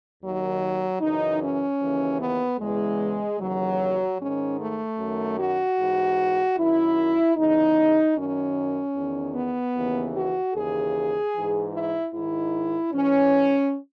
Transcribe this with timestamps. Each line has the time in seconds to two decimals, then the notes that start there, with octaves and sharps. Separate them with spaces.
0.21 D#2 D#3 F#3
1.00 F#2 C#3 E3 D#4
1.41 C#4
1.80 D#2 C#3 E3
2.20 B3
2.59 E2 C#3 E3 G#3
3.39 D#2 C#3 E3 F#3
4.19 G#2 D#3 C#4
4.58 A3
4.98 F#2 D#3
5.37 F#4
5.78 G#2 E3
6.57 F#2 D#3 E4
7.35 E2 C#3 E3 D#4
8.15 F#2 D#3 C#4
8.95 E2 D#3
9.35 B3
9.74 D#2 C#3 E3
10.15 F#4
10.54 D#2 C#3 E3 G#4
11.34 G#2 E3
11.73 E4
12.12 G#2 D#3 E4
12.92 G#2 E3 C#4